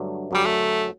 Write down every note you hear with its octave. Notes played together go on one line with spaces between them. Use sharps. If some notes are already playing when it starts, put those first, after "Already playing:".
Already playing: G2 D3 F#3 A3
F#2 D3 F#3 G3 C#4
A3